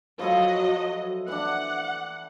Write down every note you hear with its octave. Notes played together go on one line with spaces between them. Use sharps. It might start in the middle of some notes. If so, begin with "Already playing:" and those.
F3 F#3 E4 A4 D#5
E3 D4 F#5